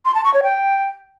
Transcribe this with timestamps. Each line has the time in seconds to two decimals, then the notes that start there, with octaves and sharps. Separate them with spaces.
0.05 C6
0.15 A5
0.24 C#6
0.34 C#5
0.43 G5